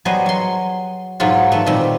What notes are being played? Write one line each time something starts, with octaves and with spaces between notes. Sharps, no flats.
F#3 G3 B3 G#4 C5 D#5
F#3 C6
G#2 B2 F#3 B3 F4
D#3 A3 B3
A#2 D#3 G3 C4